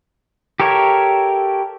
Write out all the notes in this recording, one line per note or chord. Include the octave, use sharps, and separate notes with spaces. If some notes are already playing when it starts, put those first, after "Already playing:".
G4 A4 A#4 C#5 E5